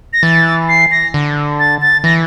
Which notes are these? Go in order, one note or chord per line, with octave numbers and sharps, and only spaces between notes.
A#6
E3 A6
C7
A#6
D3
A6
A6
E3 A#6